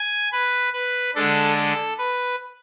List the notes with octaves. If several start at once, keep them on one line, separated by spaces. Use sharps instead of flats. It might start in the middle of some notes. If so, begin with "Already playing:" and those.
Already playing: G#5
B4
B4
D3 G#3 D4 A4
A4
B4